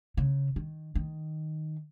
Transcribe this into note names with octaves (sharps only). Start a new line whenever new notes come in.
C#3
D#3
D#3